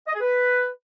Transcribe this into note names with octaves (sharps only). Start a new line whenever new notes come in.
D#5
G#4
B4